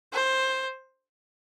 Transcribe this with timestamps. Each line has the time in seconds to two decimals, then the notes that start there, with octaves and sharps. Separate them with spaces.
0.13 C5